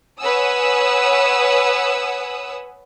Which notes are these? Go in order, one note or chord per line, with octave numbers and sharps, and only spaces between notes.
B4 C#5 F#5 G#5 D#6 E6